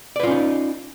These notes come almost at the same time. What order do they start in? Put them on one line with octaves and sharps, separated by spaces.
D5 B4 F4 C#4 D#4